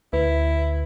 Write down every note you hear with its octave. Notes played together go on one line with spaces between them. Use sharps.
D2 E4 B4